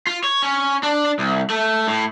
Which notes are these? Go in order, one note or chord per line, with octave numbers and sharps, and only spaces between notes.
F4
C#5
C#4
D4
C2
A3
A2